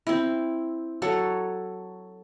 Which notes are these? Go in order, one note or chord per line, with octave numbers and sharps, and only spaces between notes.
C4 E4
F#3 A4 C#5 F#5